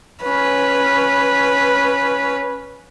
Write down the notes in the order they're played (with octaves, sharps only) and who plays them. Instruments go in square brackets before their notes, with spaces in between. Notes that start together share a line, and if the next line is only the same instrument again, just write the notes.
[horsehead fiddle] C#4 B4